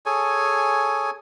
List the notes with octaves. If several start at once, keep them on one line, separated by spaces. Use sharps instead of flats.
G#4 A4 C#5 G#5